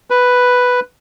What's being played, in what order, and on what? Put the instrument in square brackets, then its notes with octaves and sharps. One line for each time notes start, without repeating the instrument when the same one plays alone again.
[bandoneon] B4